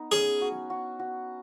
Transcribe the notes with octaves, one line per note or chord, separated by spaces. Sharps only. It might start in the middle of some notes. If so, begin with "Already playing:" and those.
Already playing: B3 D#4
C#4 G#4
F#4
F#4
F#4